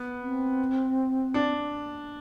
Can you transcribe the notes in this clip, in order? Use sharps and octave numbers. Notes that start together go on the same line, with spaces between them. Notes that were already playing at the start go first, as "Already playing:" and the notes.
Already playing: B3
C4
D4